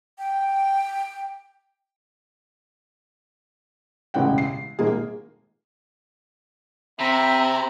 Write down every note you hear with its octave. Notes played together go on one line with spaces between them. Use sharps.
G5
E1 A1 C#3 G#3 F#5 G5
C7
D#1 G#1 A#3 G#4
C3 C4 E5 A#5 B5